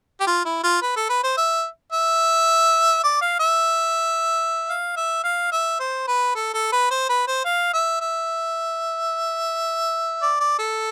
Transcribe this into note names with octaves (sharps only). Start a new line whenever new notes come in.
G4
F4
E4
F4
B4
A4
B4
C5
E5
E5
D5
F5
E5
F5
E5
F5
E5
C5
B4
A4
A4
B4
C5
B4
C5
F5
E5
E5
D5
D5
A4